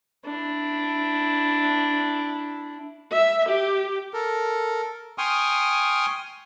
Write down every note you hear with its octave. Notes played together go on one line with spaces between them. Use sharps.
D4 E4
E5
G4
A4 A#4
G5 G#5 C6 C#6 D#6 F6